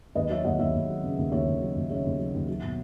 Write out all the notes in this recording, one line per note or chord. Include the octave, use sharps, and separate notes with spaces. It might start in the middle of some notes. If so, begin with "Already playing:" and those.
D#2 B4 D#5
F#3 C#5 E5
D#2 D#5 F#5
D#2 C#5 E5
D#2
F#3
C#3
D#2
D#2 C#5 E5
D#2
F#3
D#2
C#3 C#5 E5
D#2
F#3
D#2
F#3
B2